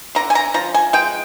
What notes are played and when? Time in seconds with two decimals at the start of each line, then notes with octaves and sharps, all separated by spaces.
0.15 D3 A#5
0.30 G#5
0.35 A#5
0.54 F3 A#5
0.74 G#5
0.93 G#3 G5